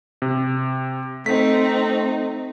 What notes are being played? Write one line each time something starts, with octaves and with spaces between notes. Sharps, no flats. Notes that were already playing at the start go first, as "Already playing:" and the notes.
C3
A3 C4 D#4 B6